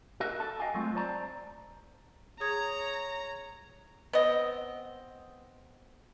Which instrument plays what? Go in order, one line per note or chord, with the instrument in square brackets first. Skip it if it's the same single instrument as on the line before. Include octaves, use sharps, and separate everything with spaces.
[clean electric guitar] F#4 A#4 D#5 E5
A4 A5
D#5 F5 G5 G#5
F#3 G#3 A3 C4 F4
C5 D5 A5 A#5
[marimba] G#4 D#6 G#6 [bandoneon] C#5 [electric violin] A#5
[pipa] B3 C4 D#5